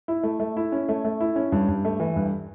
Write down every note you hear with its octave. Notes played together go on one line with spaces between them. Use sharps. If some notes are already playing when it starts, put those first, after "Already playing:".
E4
A3
A3
E4
C#4
A3
A3
E4
C#4
G2
G2
A3
E3
G2